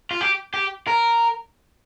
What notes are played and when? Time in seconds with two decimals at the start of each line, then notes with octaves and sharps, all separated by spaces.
0.11 F4
0.21 G4
0.54 G4
0.87 A#4